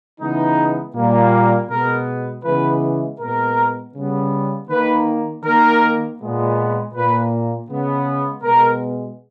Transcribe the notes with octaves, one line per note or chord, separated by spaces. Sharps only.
C#3 E3 G#3 B3 D#4
A#2 G3 A#3
B2 G#3 B3 A#4
C#3 E3 G#3 B3 B4
A#2 G#3 B3 A#4
C#3 G3 B3
D#3 A#3 B4
D#3 A#3 A#4
A#2 G#3 B3
A#2 A#3 B4
C#3 G#3 B3
B2 G#3 B3 A#4